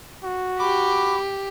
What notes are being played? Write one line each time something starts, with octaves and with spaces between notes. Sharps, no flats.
F#4
G4 B5 D6